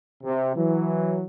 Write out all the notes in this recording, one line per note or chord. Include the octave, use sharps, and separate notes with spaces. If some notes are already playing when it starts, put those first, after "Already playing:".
C3
E3 F#3